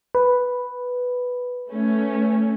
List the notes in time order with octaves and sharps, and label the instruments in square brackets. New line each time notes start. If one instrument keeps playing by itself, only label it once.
[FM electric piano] B4
[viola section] A3 C#4